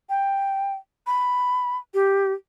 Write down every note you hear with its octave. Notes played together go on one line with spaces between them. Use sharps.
G5
B5
G4